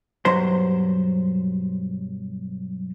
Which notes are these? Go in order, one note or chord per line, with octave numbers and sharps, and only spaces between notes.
B1 G2 F#3 C5 A#5 C6